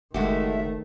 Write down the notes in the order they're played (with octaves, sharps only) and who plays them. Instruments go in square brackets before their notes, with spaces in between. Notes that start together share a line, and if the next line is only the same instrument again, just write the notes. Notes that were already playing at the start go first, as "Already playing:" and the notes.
[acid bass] F#1 [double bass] D#3 A3 [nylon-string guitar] G#3 F#4 G4 [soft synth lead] E5